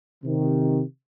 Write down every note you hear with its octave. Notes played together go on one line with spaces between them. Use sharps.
C3 D#3